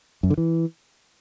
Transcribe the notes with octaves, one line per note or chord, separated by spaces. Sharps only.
F#2
D3
E3